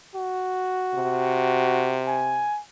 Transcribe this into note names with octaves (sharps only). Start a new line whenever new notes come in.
F#4
C3
G#5